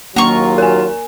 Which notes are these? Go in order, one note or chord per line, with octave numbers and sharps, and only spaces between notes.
D#2 F#3 A#3 F4 A#5 C#6
A#4 G#5